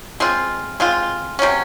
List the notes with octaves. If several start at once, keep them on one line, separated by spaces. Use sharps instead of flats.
G#3 C4 F4
G#3 C4 F4
C3 F#3 C#4